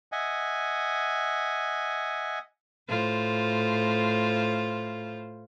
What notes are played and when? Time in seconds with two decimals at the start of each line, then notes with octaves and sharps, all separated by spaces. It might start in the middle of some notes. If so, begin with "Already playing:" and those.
0.12 D#5 E5 F#5 G#5
2.88 A2 F4 C5